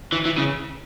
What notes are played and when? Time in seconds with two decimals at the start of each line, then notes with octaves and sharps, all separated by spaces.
0.13 E3
0.26 E3
0.38 C#3